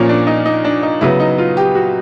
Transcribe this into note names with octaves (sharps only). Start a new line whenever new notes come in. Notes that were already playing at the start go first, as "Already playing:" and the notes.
Already playing: A#2 F3 A#3 C#4
D4
D#4
D#4
D4
D#4
C#3 F#3 B3 E4
D#4
F4
G4
F#4